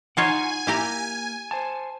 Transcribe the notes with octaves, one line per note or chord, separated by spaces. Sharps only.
D#4 F4 C#5 F#5 G#5
A#3 E4 G4 A#4 A#5
C5 G#5 A5